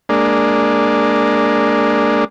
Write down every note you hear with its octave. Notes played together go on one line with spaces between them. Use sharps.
G#3 A#3 D4